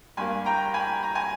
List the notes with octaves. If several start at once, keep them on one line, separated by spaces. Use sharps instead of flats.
G2 G3 A#3 G#5 B5
G5 A#5
G#5 B5
A#5
G#5